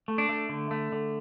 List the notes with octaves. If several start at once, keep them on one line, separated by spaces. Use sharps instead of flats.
A3
D4
A3
D3
A3
D3